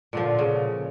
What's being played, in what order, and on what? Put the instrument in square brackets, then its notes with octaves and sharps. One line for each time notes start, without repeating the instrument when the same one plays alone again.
[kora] A#2 D3 F3
C#3